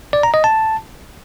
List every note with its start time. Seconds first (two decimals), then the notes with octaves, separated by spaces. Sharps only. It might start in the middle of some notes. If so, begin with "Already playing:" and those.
0.13 D5
0.23 A#5
0.34 D#5
0.44 A5